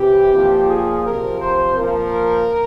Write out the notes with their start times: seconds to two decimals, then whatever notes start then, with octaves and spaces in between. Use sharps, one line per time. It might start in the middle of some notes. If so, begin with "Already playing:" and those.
Already playing: C3 E3 G4
0.34 A#2 F3
0.69 G#4
1.04 C3 F3 A#4
1.41 C5
1.76 A#2 F3 A#4